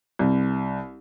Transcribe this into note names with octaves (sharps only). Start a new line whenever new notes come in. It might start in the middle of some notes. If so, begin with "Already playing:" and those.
C2